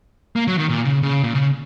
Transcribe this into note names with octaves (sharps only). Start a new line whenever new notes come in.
A#3
F#3
D#3
A#2
C#3
C#3
A#2
C#3